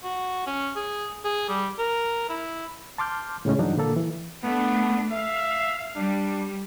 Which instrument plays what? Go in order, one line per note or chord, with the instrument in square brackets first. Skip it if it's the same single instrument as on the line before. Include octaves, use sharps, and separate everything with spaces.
[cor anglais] F#4
C#4
G#4
G#4
G3
A#4
E4
[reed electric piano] A5 C6 D6 F6 G6
A2 C#3 G#3 C#4
G2 E3 F#3 D4 D#4
A#2 D3 A#3 A4
E3
[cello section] A3 D4 [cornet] B3
[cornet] E5 [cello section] F5
[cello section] G3 [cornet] D4